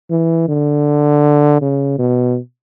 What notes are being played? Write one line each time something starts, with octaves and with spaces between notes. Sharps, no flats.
E3
D3
C#3
B2